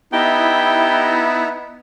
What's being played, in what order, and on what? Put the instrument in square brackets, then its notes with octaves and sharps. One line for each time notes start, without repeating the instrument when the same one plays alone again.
[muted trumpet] B3 [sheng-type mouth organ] D#4 E5 A#5 [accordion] E4 [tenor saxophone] G4